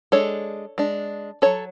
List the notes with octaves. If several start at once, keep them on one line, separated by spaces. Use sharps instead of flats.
G#3 D4 A4 C#5
G#3 D4
F#3 C#4 A4 C#5